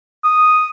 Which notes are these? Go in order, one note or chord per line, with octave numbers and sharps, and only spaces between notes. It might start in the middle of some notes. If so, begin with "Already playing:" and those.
D#6